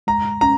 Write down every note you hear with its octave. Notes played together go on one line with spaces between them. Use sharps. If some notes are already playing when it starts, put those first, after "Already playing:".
G#3 A#5
C#4 A#5